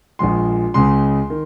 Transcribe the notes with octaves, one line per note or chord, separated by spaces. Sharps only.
A#1 A#2 F3 G#3 C6
C#2 C#3 G#3 C6
D#3